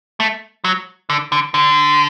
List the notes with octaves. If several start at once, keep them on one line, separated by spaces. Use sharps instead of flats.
A3
F#3
D3
D3
D3